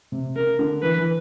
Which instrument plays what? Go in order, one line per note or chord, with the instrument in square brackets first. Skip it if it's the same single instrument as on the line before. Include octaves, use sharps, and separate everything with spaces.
[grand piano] C3
[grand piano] C#3 [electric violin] A#4
[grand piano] D3
[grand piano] E3 [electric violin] B4
[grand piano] E3